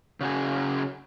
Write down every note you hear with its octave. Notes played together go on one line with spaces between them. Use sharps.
C#3 F#4 G#4